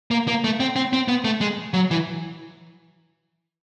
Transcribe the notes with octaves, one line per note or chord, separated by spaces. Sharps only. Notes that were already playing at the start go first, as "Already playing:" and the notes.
A#3
A#3
A3
C4
C4
C4
B3
A3
G#3
F#3
E3